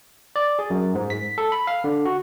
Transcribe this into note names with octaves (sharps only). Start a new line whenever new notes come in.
D5
G#4
F#2
G#2
B6
A4
B5
F5
D3
F#4